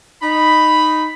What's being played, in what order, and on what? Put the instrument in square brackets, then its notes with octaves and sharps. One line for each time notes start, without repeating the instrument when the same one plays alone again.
[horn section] D#4 B5